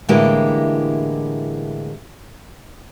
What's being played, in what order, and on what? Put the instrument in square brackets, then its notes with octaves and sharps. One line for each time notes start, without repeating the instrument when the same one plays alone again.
[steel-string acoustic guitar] A2 D3 E3 G#3 A#3 G4